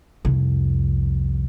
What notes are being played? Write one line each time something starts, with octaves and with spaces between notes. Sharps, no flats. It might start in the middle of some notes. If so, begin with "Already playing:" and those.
C2 F2